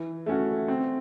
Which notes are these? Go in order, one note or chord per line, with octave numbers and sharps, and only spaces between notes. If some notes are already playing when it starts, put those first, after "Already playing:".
Already playing: E3
A3 C#4 F#4
C4